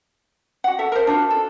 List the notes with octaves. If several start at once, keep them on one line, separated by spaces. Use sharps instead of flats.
F#4 F#5
A4 E5
A#4 C5
D4 F4 F#4
A4